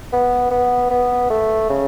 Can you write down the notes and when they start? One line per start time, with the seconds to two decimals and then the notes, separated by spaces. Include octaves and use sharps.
0.13 B3
0.51 B3
0.90 B3
1.30 A3
1.69 C#3